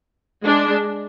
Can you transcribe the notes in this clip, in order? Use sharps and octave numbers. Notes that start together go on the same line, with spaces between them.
G#3 D4